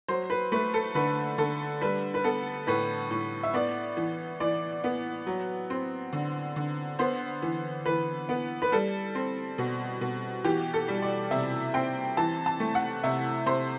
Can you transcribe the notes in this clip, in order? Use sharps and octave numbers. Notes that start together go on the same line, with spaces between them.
F#3 C5
B4
A3 B4
A4
D3 B4
D3 A4
G3 B4
B4
B3 A4
A2 B4
A2
E5
B3 D5
E3
E3 D5
B3
F#3
C4
D3
D3
B3 C5
E3
E3 B4
B3
B4
G3 A4
C4
B2
B2
E3 G4
A4
G3
D5
C3 E5
C4 G5
E3 A5
A5
A3
F#5
C3 E5
C3 C5